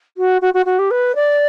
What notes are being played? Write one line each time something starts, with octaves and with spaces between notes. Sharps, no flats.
F#4
F#4
F#4
F#4
G4
B4
D5